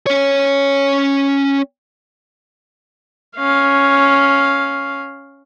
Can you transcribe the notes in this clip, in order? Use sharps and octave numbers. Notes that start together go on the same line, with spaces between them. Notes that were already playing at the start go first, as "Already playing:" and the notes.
C#4 C#5
C#4 F5